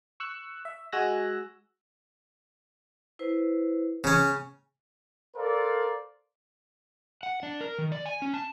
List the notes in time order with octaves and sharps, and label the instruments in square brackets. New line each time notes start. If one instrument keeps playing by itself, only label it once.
[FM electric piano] C#6 E6 F#6
E5
G#3 F#4 G#5 E6 F#6 A#6
[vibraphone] E4 B4 C5
[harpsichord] C#3 C#4 [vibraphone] G#5
[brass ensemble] A4 A#4 C5 D5 F5
[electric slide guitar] F#5
D4
A#4
D#3
D5
G#5
C#4
A5